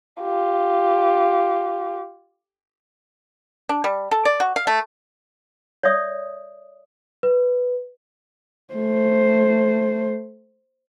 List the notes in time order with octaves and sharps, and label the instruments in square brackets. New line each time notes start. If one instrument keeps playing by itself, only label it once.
[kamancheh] F4 G4
[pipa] D4
G3
A4
D5
F#4
F5
A3
[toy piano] C#5 D5 E5 D#6
[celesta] B4
[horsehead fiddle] A3 C5